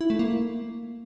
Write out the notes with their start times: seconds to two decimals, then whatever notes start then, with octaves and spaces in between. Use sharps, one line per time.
0.01 E4
0.10 A3
0.19 A#3